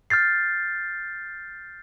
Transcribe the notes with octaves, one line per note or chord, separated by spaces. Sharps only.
F6 G6 A6 C7